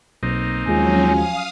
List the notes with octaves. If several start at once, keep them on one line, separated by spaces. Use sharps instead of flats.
B1 A#3 C4 D#4
D#2 F3 F#3 G#3 C#4 F4 G#5
F5 D#6